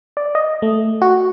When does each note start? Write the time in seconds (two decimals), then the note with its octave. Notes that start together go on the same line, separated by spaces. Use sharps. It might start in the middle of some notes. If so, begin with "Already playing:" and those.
0.17 D5
0.35 D#5
0.62 A3
1.02 F#4